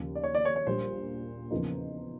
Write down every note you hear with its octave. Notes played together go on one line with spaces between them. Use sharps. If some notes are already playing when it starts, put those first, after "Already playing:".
Already playing: D#2 C#3 F3
D5
C#5
D5
C#5
C#5
A#1 A#2 G3 C5
E2 C#3 F3 A#3 D#4